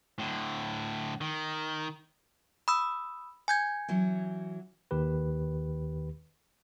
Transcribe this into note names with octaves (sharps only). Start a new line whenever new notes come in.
A2 D3
D#3
B5 D#6 E6
G#5 G6 G#6
E3 F#3 C#4
D#2 D#3 G4 B4